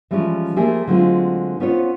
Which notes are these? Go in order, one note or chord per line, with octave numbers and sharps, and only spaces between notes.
E3 F3 G3 G#3 C#4
F3 A3 A#3 G4 G#4
D3 F#3 G#3 A3 C4 F4
B3 C#4 F4 C5 C#5